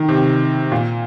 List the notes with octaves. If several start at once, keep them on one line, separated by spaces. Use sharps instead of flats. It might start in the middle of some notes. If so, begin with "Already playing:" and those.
Already playing: D#3
C3
A#2